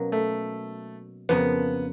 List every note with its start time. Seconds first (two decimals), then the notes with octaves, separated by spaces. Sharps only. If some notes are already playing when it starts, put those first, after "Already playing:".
Already playing: B2 F#3 A#3 C#4
0.12 A3
1.29 F2 C#3 F3 A#3 B3